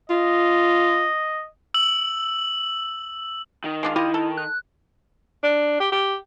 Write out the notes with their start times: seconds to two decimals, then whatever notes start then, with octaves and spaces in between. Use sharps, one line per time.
0.10 F4 D#5
1.74 E6 F#7
3.64 D#3
3.83 G#3 D4 F4
3.96 E4 F4 G4 D#5
4.14 A4
4.37 F#6
5.43 D4
5.80 G4
5.92 G4